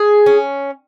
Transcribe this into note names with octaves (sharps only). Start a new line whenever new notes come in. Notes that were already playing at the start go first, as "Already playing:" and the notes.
Already playing: G#4
C#4